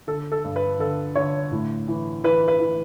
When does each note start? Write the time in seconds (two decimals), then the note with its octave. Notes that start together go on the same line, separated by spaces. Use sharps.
0.07 D3 A4
0.32 A4
0.44 G2
0.56 B4
0.79 D3 A4
1.15 D3 C#5
1.52 A2
1.88 E3
2.24 E3 B4
2.48 B4
2.60 E3